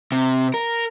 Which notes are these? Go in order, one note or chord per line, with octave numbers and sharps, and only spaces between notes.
C3
A#4